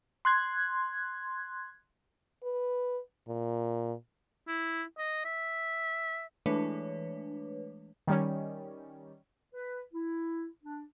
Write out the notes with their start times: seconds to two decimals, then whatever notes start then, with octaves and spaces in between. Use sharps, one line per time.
0.25 C6 F#6 G#6
2.43 B4
3.28 A#2
4.48 E4
4.98 D#5
5.25 E5
6.46 E3 G#3 A3 D4 B4 C#5
8.08 D#3 G3 C#4
9.53 B4
9.93 E4
10.64 D4